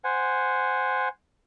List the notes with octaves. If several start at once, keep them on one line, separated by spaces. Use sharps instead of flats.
C5 F#5 G#5